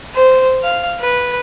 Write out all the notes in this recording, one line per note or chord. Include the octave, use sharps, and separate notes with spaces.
C5
F5
B4